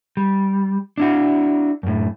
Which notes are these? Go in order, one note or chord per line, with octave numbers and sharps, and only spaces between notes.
G3
D4 E4 F#4
F#2 A2